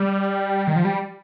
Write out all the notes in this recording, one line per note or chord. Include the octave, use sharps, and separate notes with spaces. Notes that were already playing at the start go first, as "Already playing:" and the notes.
Already playing: G3
D#3
F3
G3